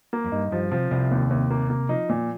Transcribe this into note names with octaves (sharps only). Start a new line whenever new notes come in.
A#3
F2
G2 D#4
G2 F3
C3 F3
C2 C3
D#2
D#2
A#3
A#3
F3 D#4
A#2